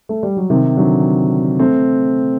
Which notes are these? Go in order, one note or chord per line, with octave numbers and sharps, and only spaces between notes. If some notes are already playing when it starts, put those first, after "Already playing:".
A3
G3
F#3
C3 D#3
D3 F#3
A3 C4